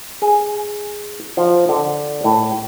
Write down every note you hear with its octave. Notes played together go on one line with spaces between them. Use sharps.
G#4
F3
D3
A2